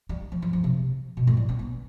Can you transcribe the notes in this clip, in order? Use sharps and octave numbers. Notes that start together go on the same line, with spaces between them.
G3
F3
F3
F3
C3
B2
A2
G3
C4
B3